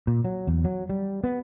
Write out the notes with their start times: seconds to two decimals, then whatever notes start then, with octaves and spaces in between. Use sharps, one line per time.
0.07 A#2
0.25 F#3
0.47 E2
0.65 F#3
0.89 G3
1.24 B3